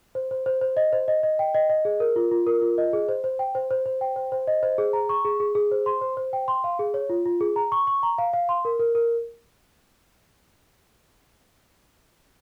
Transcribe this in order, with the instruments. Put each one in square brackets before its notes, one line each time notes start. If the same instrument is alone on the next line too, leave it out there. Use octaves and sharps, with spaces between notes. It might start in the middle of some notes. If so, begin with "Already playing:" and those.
[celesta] C5
C5
C5
C5
D#5
C5
D#5
D#5
G5
D#5
D#5
G#4
A#4
F4
F4
A#4
F4
D#5
G#4
C5
C5
G5
C5
C5
C5
G5
C5
C5
D#5
C5
G#4
A#5
C#6
G#4
G#4
G#4
C5
C6
C5
C5
G5
C6
F5
G#4
C#5
F4
F4
G#4
A#5
C#6
C#6
A#5
F5
F5
C6
A#4
A#4
A#4